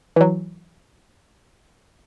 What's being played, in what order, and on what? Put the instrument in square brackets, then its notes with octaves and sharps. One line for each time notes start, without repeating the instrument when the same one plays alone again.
[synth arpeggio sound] E3 F#3